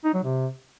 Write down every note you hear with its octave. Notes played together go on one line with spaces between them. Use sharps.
D#4
F#3
C3